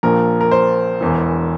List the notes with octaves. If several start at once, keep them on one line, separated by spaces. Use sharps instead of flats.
A#1 A#2 F3 A#4
A#4
C5
E1 E2 E3